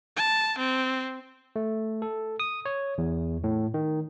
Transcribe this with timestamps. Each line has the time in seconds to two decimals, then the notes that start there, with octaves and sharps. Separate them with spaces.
0.16 A5
0.58 C4
1.56 A3
2.02 A4
2.40 D#6
2.66 C#5
2.98 E2
3.44 A2
3.74 D#3